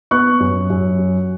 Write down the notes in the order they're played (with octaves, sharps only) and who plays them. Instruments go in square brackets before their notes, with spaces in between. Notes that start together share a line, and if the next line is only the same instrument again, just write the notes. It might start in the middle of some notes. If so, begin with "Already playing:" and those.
[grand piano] B3 C#6 F#6
F#2
F#2
F#3